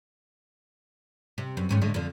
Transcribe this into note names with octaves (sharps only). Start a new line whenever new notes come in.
C3
F#2
D#2 G#2 C#4
A2 D3 G#3
F2 D3